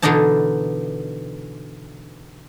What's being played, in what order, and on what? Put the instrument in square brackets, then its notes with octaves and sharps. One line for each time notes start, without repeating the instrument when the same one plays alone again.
[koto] B2 D3 E3 D4 D#4 A5